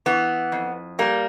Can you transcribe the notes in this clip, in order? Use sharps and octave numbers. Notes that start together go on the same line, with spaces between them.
E3 B3
F2
G3 A#3